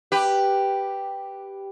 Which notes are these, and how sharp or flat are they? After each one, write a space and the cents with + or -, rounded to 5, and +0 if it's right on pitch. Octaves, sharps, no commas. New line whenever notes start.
G4 +0 B4 +0